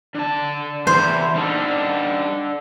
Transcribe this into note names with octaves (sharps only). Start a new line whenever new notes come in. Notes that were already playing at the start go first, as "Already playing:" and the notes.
D3 A5
E2 E3 G3 C5
G3 D4 D#4 A4